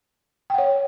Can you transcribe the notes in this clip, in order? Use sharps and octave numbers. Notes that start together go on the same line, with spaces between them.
C#5 F#5 G5